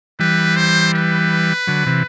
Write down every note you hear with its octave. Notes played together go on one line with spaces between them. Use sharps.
E3 G3 B4
C5
B4
D3 F#3
C3 E3